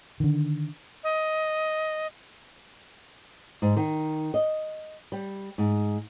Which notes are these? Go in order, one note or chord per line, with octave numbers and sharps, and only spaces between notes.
D3 D#3
D#5
G#2
D#3
D#5
G3
G#2